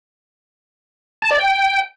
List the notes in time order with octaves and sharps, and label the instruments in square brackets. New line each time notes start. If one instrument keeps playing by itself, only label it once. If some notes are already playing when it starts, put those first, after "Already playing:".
[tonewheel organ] A5
D5
G5